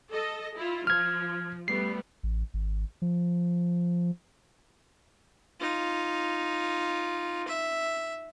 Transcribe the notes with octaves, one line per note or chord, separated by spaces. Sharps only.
A4 D#5
E4 F4
F3 F6 G#6
G3 A3 B3 C7
A1
G#1
F3
D#4 F4
E5